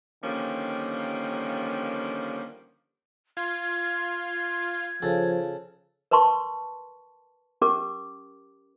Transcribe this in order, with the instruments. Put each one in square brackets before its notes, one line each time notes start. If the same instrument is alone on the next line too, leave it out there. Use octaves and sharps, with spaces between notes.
[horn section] D3 D#3 F3 G3 A#3 C#4
[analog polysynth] F4 [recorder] G#6
[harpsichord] C#3 A4 [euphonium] F3
[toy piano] A#4 B4 A5 C6 C#6
C#4 G4 A#4 D6